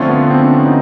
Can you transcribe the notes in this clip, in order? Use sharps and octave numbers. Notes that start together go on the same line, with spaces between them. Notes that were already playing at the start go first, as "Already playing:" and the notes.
Already playing: D3 F3 A3 C4 C#4 F4
B3
C4
D4
C#4
D#4